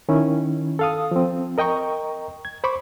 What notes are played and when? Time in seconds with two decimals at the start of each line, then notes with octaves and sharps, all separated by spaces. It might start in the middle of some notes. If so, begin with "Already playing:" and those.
0.09 D#3 C#4 E4
0.79 A4 F5 D#6
1.11 F3 C4
1.58 A#4 D#5 G5 A#5 C#6
2.45 G#6
2.64 C5 B5 C#6 D6